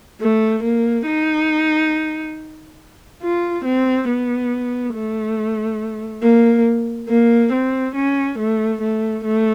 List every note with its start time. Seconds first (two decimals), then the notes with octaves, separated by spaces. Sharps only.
0.20 A3
0.63 A#3
1.06 D#4
3.22 F4
3.65 C4
4.08 B3
4.93 A3
6.23 A#3
7.09 A#3
7.52 C4
7.95 C#4
8.38 A3
8.81 A3
9.24 A3